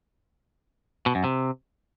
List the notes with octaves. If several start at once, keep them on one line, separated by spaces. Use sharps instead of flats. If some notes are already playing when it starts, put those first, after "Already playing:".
B2
F#2
C3